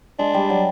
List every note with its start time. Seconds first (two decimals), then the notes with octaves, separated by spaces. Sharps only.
0.19 G#3 D4
0.34 G3
0.50 F#3